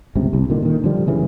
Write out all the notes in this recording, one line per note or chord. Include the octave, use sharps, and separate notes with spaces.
G1 C#2 C3
C2
A#2 D3 D#3
A#2 D#3
D3 F3 G3
F#1 C#3 E3